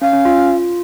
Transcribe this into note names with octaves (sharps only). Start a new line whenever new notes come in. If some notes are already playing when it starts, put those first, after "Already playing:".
C#4 F5
C#4
F4